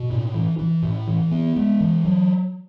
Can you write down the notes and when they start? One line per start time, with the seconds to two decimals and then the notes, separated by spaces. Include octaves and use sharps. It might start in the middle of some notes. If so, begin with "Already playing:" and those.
Already playing: B2
0.10 A2
0.34 E3
0.59 E3
0.82 A2
1.07 E3
1.31 B3
1.56 G#3
1.81 E3
2.05 F#3